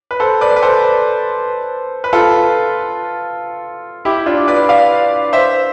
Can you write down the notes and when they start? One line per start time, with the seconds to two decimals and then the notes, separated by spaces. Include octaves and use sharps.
0.11 B4
0.20 A4 C5
0.41 B4 D5
0.56 B4
0.62 A4 C5
2.04 B4
2.13 F4 A4
4.05 E4 G4
4.26 D4 F4
4.48 B4 D5
4.69 D5 F5
5.33 C5 E5